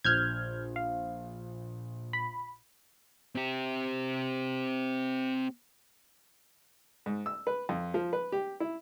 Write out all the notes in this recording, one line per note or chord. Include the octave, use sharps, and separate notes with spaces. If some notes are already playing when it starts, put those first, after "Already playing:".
A#1 F6 G6 G#6
F5
B5
C4 G4
G#2
E6
B4
F2
F3
B4
G4
E4